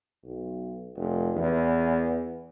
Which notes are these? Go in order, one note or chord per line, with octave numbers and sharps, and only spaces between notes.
B1
F1
E2